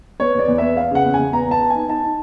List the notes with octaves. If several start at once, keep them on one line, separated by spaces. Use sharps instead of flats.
B3 C#5
E2 D5
E2
B3 E5
B3 F5
C#3 F#5
E2
G#5
E2
B3 A#5
B3 A5
B3
G#5
D#4
D#4 A5
D#4